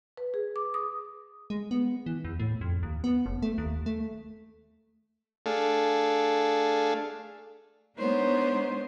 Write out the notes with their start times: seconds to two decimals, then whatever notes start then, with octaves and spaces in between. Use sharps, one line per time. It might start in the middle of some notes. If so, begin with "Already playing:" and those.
0.17 B4
0.34 G#4
0.56 D6
0.74 D#6
1.50 G#3
1.71 B3
2.06 E3
2.25 E2
2.40 A2
2.61 F2
2.83 D#2
3.04 B3
3.26 F#1
3.42 A3
3.58 D#2
3.86 A3
5.46 A3 D4 G#4 A4 F5
7.97 G#3 B3 D4 D#4 C5 C#5